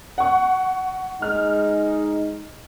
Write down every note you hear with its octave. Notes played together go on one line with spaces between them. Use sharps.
F#5 C#6
G#3 D#4 F6